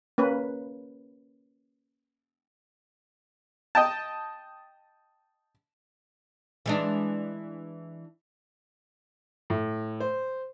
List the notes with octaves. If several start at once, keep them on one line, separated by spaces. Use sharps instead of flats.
A#3 C#4 B4
D#5 G5 A5
E3 G#3 D4
A2
C5